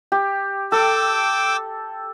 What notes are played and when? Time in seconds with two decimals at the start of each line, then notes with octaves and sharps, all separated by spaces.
0.12 G4
0.72 A4 G5 D6 E6